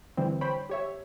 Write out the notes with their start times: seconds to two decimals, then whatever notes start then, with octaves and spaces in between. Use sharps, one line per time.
0.17 D3 E3 G3 C4
0.41 C5 C#5 G5 B5
0.70 G4 C#5 E5